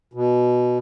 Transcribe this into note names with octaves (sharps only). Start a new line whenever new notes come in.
B2